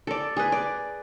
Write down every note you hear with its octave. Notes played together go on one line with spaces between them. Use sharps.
A4 D5
G#4 B4
D5